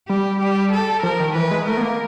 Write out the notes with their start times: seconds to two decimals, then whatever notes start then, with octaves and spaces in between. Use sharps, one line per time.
0.09 G3 G4
0.41 G4
0.72 A4
1.03 F3 A#4
1.20 D#3
1.35 E3 B4
1.51 G#3
1.67 A3 A#4
1.77 B3
1.82 A#3